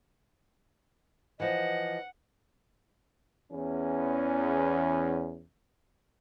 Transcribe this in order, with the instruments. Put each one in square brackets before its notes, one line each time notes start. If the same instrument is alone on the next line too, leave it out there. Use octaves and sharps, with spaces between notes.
[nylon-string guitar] E3 F3 [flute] D#5 [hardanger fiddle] F#5
[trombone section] E2 C#4